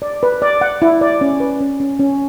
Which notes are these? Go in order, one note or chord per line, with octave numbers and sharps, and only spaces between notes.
D5
B4
D5
F#5
E4
D5
C#4
B4
C#4
C#4
C#4